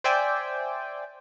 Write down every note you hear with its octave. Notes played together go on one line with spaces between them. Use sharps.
C5 D5 E5 G5 G#5